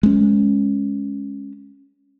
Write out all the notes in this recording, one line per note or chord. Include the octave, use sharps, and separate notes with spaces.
G#3 C#4